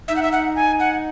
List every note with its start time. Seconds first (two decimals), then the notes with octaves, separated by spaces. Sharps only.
0.08 D#4 E5
0.16 F#5
0.23 E5
0.32 F#5
0.55 G#5
0.80 F#5